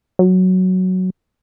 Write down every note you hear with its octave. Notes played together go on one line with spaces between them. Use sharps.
F#3